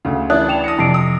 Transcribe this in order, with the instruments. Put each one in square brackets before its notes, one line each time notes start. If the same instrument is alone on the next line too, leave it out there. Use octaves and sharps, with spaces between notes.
[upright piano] D2 C#3 [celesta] F5
[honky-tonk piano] E3 D4 [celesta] E5 D#6 F#6
[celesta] G5 E7 F7
[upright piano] D#6 A#6 C#7
[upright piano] F2 C3 [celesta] A5 C7 D7
[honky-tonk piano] D#6